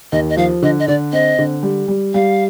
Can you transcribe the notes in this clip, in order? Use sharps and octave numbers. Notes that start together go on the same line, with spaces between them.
D#2 D#5
D#5
F3 F5
D3 D#5
D#5
D3 D5
C4 D#5
D3
G3
G3
G3 F5